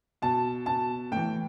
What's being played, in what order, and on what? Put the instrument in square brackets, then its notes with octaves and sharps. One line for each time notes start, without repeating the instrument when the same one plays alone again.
[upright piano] B2 A5
B2 A5
A2 E3 G5